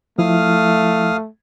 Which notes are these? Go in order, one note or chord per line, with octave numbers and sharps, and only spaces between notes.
F3 A3 E4 F5 D#6 F6